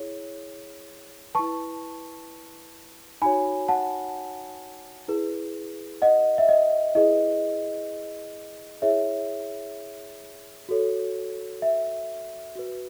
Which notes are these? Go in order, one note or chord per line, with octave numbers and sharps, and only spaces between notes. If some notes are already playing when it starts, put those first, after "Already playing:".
Already playing: E4 G#4 C#5
E4 B4 A5 C#6
D#4 F#4 C#5 G#5 B5
F#5 A5
E4 G#4 B4
D#5 F#5
E5
D#5
E4 G#4 B4 D#5
E4 G#4 C#5 E5
F#4 A4 C#5
E5
F#4 B4